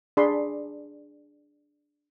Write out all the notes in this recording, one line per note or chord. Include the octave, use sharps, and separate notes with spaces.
D4 G#4 D5 B5 C6